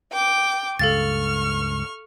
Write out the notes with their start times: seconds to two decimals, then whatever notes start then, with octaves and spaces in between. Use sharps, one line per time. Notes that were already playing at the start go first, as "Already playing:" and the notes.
0.12 G5 D6
0.79 C#2 G2 A4 F5 C#6 F6 A6